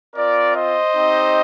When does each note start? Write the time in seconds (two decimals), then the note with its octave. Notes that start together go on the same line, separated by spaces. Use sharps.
0.15 C4 F4 A#4 D5
0.55 C5 D#5
0.95 C4 D#4 G4